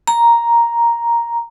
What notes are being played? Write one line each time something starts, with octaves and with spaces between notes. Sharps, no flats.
A#5